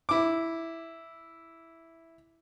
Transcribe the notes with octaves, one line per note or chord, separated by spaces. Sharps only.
E4 D6